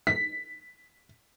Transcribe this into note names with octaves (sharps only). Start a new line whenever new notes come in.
B6